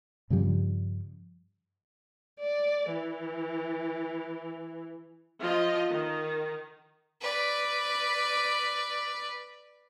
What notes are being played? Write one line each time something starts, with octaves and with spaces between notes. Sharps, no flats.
G2 C#3 F3 G3
D5
E3
F3 F4 D#5
D#3
B4 D5